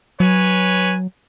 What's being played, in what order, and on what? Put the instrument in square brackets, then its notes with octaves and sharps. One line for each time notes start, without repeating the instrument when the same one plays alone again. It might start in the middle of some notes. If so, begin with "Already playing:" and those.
[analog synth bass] F#3 [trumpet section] B4 C#5 G#5